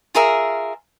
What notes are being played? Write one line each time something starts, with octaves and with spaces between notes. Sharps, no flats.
F4 G#4 A#4 E5